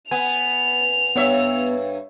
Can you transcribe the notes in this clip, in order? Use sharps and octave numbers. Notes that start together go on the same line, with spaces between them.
B3 G#5 F7
G2 B3 C#5 E5